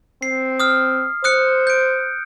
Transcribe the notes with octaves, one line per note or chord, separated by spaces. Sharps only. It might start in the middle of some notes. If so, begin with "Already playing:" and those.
C4 C7
D#6 F6
C5 D#6 F#6 C#7
G6 D7